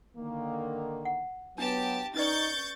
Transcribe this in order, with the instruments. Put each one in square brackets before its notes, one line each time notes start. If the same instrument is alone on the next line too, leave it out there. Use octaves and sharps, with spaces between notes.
[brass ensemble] D3 D#3 A#3
[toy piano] F#5
[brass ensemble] F#3 B3 [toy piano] D4 [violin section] G4 A5
[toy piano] C#4 B4 D5 [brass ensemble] D#4 [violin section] C#6 G6 A6